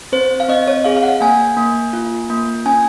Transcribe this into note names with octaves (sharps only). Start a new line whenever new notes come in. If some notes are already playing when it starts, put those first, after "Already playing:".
C4 C5
F5
C4 D#5
C#5
G#4 F5
F5
F#5
A#3 G#5
A#3
F4
A#3
C#4 G#5